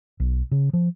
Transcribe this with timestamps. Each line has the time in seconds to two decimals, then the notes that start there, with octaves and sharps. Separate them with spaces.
0.20 B1
0.51 C#3
0.73 F3